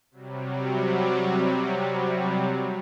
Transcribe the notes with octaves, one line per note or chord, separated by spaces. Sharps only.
C3 F#3 G3